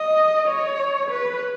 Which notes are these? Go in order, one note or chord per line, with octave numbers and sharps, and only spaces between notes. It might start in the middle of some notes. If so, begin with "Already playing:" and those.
Already playing: D#5
C#5
B4